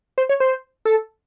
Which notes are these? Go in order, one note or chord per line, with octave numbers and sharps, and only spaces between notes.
C5
C#5
C5
A4